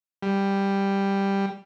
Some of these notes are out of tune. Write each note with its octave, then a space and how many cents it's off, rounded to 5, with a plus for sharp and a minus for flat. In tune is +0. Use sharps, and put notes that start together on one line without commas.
G3 +5